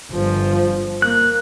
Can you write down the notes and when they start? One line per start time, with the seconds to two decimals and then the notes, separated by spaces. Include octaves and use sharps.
0.12 G1 F3
1.02 A#3 F#6